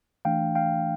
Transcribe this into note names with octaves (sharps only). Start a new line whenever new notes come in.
E3 A3 D4 F5 G5
F5 G5